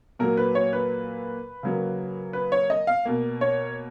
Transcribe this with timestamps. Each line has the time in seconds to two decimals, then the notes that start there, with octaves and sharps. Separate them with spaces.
0.19 A#2 F#3 A#3 A#4
0.37 B4
0.55 C#5
0.73 B4
1.63 C#3 F#3 A#3
2.33 B4
2.52 C#5
2.70 D#5
2.87 F5
3.05 B2 A#3
3.41 C#5